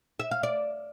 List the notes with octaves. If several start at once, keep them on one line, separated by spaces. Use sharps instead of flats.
E5
F5
D5